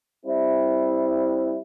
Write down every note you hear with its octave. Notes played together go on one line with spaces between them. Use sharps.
G3 C4 E4